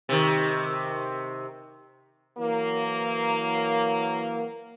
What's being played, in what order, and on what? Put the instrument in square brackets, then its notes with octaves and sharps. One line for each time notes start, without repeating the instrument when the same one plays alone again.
[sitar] C3 D#3
[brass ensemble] E3 F#3 A#3